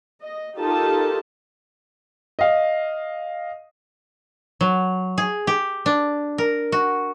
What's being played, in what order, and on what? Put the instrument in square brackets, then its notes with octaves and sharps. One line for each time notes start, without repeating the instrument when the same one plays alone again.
[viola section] D#5
D#4 F4 G4 A4 A#4 A5
[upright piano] D#5 F5
[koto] F#3
G#4
G4
D4
A#4
F#4